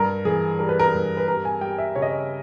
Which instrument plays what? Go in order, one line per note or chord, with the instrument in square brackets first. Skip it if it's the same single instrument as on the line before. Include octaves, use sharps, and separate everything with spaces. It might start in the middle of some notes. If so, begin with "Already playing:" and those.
Already playing: [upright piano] G2 A#4
E3 G#4
G3 A#4
B4
A#4
G2
B4
G3 A#4
G#5
G3 G5
E5
C#3 C#5
D#5
C#5